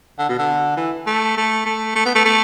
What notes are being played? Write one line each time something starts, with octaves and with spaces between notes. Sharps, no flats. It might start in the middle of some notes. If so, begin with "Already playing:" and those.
D3
B2
D3
E3
A3
A3
A3
A3
B3
A3
A3